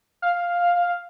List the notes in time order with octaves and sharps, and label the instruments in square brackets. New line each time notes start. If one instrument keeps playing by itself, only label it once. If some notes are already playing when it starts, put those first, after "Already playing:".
[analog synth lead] F5